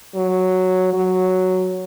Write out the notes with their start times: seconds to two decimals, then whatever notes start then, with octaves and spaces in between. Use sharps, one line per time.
0.15 F#3
0.93 F#3